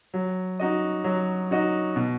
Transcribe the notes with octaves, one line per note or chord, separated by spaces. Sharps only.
F#3
D#4 F#4 D#5
F#3
D#4 F#4 D#5
B2